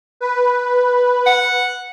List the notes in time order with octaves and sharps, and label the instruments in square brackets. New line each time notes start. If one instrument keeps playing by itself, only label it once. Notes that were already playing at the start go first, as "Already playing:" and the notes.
[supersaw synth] B4
[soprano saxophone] F#5